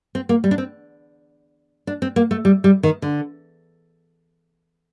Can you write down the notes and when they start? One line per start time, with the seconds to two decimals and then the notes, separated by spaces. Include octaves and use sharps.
0.15 C4
0.29 A#3
0.44 G3
0.51 D4
0.58 C4
1.87 D4
2.02 C4
2.16 A#3
2.31 A3
2.45 G3
2.64 G3
2.83 D#3
3.02 D3